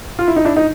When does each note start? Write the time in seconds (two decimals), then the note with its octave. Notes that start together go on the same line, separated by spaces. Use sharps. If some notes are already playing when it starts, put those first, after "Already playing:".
0.19 F4
0.28 E4
0.36 D#4
0.45 D4 E4
0.57 D#4